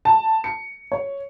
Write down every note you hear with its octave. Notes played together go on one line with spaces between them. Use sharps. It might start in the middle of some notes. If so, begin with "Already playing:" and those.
A5
C#7
C#5